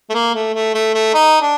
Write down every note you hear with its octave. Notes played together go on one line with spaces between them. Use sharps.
A3
A#3
A3
A3
A3
A3
D#4
D4